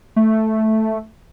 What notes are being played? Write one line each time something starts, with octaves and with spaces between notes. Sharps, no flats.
A3